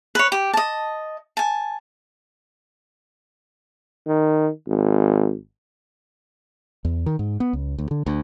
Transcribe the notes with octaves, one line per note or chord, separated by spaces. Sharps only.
B4 C#5
G4
D#5 A5
G#5 A5
D#3
G#1
E2
D#3
G#2
B3
C#2
D2
D3
D2